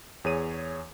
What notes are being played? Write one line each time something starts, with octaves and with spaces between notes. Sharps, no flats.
E2 G#4 C#5 D#7